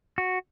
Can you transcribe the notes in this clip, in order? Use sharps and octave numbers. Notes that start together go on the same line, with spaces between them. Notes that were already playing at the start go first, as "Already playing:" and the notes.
F#4